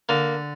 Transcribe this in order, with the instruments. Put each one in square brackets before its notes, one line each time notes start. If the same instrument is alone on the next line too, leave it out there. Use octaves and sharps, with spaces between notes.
[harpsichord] D3 A#3